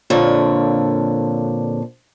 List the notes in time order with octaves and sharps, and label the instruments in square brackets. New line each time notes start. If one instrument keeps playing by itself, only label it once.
[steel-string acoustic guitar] F2 A#2 D3 C#5